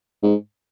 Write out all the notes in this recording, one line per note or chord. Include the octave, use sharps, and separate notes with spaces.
G#2